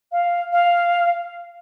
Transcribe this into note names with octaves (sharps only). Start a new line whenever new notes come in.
F5
F5